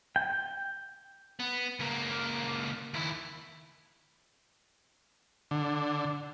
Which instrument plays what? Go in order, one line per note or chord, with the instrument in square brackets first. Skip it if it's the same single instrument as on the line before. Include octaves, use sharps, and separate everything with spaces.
[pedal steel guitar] G5
[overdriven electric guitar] B3
C#2 A#3
D#2 E4
[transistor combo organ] D3